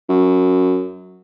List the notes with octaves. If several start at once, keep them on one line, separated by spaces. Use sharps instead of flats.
F#2